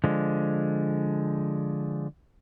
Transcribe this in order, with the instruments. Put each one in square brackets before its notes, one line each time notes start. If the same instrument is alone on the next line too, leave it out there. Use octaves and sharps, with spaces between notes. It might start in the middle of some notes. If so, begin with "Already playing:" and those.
[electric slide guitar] D3 F3 G#3